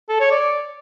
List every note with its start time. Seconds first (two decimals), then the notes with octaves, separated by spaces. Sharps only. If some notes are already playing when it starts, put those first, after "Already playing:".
0.09 A4
0.20 C#5
0.31 D5